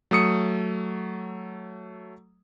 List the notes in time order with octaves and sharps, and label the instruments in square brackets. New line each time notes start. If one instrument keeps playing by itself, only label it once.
[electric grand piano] F#3 A3 D#6 C#7